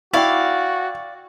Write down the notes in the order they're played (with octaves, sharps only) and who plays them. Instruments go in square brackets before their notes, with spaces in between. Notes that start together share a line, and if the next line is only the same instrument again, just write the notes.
[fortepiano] E4 [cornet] F#4 [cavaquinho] D5 F5 [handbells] G5 C#6